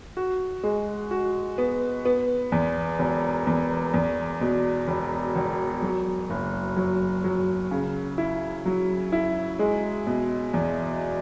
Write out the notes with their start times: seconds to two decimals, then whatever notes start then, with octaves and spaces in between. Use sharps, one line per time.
0.17 F#4
0.63 G#3
1.11 F#4
1.58 B3
2.05 B3
2.52 E2
2.99 E1
3.47 E2
3.94 E2
4.41 B2
4.88 E1
5.35 E1
5.82 F#3
6.30 F#1
6.76 F#3
7.24 F#3
7.71 C#3
8.18 E4
8.66 F#3
9.12 E4
9.59 G#3
10.07 B2
10.54 E2